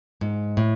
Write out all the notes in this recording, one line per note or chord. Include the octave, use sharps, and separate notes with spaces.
G#2
A2